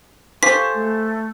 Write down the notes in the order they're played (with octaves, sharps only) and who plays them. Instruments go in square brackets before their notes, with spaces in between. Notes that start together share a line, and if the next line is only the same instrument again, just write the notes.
[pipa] F4 G4 C5 [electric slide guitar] A4 G#5 [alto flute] C#6 [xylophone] B6
[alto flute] A3